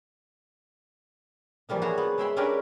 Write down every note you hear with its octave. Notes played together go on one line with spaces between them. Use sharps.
E3 F3 G3 A#3 D#4
F#4 G#4 C5 C#5
B3
G#3 C#5 E5 G5 B5 C6
C#4 D4 G4 A#4 B4